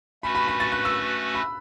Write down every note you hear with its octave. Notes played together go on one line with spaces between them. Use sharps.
A3 C#4 F#4 B4 B5
B5
B5
A6
F#6
E6
B5